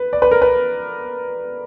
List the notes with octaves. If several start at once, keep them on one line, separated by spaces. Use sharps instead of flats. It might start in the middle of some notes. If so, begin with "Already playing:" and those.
Already playing: B4
D5
B4
A#4
B4